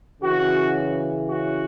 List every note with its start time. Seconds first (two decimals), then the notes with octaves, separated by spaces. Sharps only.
0.22 C#3 E3 C#4 F#4
1.29 F#4